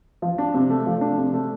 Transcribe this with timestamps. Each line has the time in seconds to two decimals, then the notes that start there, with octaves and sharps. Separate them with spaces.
0.22 F3
0.38 D4
0.54 C3
0.70 A3
0.86 F3
1.01 D4
1.18 C3
1.33 A3